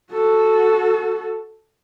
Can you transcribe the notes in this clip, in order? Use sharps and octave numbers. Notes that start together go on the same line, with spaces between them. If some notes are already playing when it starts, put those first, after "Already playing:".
F#4 A4